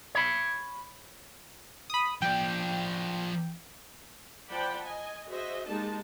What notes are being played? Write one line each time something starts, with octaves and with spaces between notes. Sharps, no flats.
C#5 B5
B5 D#6
F3 D5 G5
F3 D5 F#5 G5 A5 B5
D#5 G#5
F#4 G#4 C5 D#5 E5
G#3 A#3 D#4 G4 A5